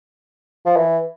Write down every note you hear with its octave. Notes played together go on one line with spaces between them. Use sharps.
F3
E3